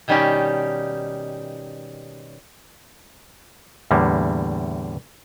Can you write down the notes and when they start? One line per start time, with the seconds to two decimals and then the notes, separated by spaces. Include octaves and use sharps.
0.08 B2 D#3 G3 C#4 D#4 G4
3.91 E2 A2 D3 G3 A#3